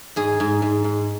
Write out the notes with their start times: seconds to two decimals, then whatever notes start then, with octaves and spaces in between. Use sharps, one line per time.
0.16 G#2 G#4
0.40 G#2
0.62 G#2
0.84 G#2